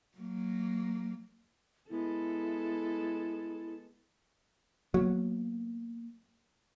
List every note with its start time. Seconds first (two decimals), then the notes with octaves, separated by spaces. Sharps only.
0.17 F#3 A#3
1.90 G#3 B3 E4 A4
4.94 F#3 A#3 B3